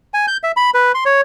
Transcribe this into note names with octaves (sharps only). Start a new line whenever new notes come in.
G#5
G6
E5
B5
B4
C6
C#5